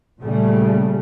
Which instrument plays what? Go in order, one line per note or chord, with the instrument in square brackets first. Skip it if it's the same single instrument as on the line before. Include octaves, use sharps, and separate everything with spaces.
[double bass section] A#2 C#3 G3 A3